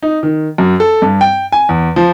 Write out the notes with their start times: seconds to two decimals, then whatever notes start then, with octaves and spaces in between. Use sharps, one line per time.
0.03 D#4
0.23 D#3
0.58 F#2
0.80 A4
1.02 G2
1.21 G5
1.52 G#5
1.69 E2
1.96 F3